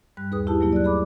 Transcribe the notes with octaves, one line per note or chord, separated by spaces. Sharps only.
G2 G3 F#6
D#2 G#4 B4 D#6
E4 G4 A5
B2 F#3 A3 A#3 E4
D5 F#6
G#4 B5 D6